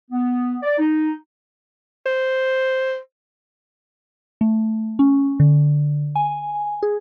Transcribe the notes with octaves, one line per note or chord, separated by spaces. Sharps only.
B3
D5
D#4
C5
A3
C#4
D3
G#5
G#4